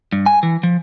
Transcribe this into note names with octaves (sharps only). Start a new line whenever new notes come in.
G2
G#5
E3
F3